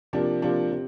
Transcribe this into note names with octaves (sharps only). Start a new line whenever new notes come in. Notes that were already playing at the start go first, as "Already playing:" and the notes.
C3 F3 A#3 D4
C3 F3 A#3 D4
C3